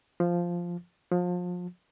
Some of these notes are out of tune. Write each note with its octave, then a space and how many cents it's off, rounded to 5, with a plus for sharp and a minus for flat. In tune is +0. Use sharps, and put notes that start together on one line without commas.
F3 -5
F3 +30